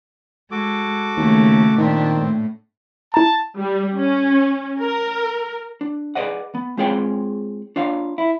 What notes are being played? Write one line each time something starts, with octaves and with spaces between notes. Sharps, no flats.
G#3 F#4 A4 D6
D#2 C#3 A3
A#2 D#3 C4 D4
A2
E4 A5 A#5
G3
C#4
A#4
D4
G#4 A4 B4 D5 D#5 F#5
B3
G#3 C4 F4 G#4 C#5 G5
D4 F4 C#5 F5
E4